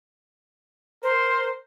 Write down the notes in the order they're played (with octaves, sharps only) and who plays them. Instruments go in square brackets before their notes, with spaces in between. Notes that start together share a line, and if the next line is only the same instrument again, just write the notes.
[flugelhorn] A#4 [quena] C5